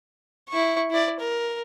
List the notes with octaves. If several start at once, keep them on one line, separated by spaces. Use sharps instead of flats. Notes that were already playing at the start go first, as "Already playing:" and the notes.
E4 C#6
E4 D5
A#4